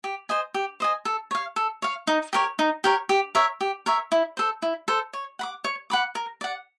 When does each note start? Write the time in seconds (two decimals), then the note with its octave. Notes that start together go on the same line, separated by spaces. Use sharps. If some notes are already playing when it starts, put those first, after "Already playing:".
0.04 G4
0.29 C5 D#5 G#5
0.54 G4
0.80 C5 D#5 G#5
1.05 A4
1.31 C#5 F5
1.56 A4
1.82 C#5 F5
2.07 D#4
2.33 G4 A#4 C#5
2.59 D#4
2.84 G4 A#4 C#5
3.09 G4
3.35 A#4 C#5 E5
3.61 G4
3.86 A#4 C#5 E5
4.12 E4
4.37 A4 C5
4.62 E4
4.88 A4 C5
5.13 C#5
5.39 F#5 B5 D6
5.64 C#5
5.90 F#5 B5 D6
6.15 A#4
6.41 D5 F#5